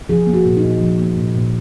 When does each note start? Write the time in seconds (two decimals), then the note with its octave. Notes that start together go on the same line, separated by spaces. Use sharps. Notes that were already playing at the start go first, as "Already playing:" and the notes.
0.09 F3 G#4
0.27 A#3
0.34 F#4
0.46 A#2
0.57 D#4
0.63 A#2
0.81 F3
0.99 A#3
1.16 A#2
1.35 A#2